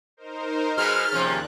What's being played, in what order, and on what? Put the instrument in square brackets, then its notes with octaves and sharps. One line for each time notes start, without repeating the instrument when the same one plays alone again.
[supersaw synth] D#4 A#4 C5
[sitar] B2 G#3 B3 [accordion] F6 [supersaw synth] G6 A6
[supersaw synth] D#2 D4 F#6 [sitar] C3 F3 C#4